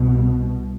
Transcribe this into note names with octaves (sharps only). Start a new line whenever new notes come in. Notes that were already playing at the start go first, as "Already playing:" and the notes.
Already playing: C2 B2